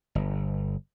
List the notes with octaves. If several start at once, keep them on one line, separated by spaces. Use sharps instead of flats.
G1